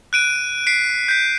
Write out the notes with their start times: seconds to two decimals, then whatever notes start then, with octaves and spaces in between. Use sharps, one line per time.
0.13 F#6 D7 D#7
0.67 B6 C7 D7
1.08 G6 B6